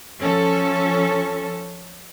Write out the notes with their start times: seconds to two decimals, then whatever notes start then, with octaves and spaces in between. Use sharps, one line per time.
0.20 F3 C#4 A4